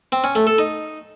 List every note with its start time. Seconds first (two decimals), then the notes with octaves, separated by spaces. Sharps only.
0.12 C4
0.24 C#4
0.35 A3
0.47 A4
0.58 D#4